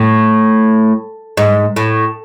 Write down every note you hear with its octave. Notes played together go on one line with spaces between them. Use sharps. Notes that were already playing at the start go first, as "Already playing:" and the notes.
Already playing: A2
G#2
A2